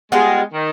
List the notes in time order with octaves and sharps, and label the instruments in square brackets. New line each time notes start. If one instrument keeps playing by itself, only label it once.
[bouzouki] G3 B3 F4 G#4 [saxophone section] G#3
[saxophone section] D#3